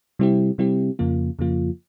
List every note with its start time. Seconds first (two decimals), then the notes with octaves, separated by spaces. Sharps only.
0.19 C3 G3 C4 E4 G4
0.58 C3 G3 C4 E4 G4
0.99 F2 C#3 F3 A#3 F4
1.39 F2 C#3 F3 A#3 F4